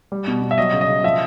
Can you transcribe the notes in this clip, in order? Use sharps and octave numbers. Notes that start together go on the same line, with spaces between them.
G3
B2
B2
E5
F#3 D#5
C#3
D#5
C#3
F3 E5